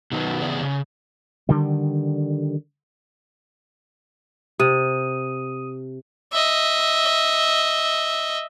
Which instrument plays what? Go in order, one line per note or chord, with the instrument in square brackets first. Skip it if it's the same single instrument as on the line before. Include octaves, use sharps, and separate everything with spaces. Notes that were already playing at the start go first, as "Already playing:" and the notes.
[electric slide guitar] B2 D#3 F#3 B3
C#3 E3 B3 G#4 D5
C#3
[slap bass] D3 D#3 G3
[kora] C3 [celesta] D#6 D#7
[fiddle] D#5 E5